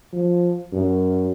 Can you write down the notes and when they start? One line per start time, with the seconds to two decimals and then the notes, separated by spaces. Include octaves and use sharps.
0.13 F3
0.73 F#2